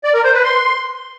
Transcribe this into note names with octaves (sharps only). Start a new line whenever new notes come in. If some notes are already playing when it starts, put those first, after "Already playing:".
D5
A#4
C5
B4
C6